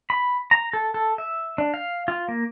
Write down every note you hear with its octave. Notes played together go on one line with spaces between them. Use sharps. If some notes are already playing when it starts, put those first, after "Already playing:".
B5
A#5
A4
A4
E5
D4
F5
F4
A#3